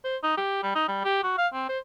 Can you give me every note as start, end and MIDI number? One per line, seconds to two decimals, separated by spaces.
0.04 0.17 72
0.23 0.35 63
0.37 0.60 67
0.63 0.72 55
0.75 0.85 63
0.88 1.03 55
1.04 1.19 67
1.23 1.36 66
1.38 1.47 77
1.54 1.68 60
1.69 1.79 72